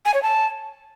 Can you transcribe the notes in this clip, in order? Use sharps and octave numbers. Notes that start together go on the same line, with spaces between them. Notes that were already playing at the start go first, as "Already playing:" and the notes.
G#5
C#5
A5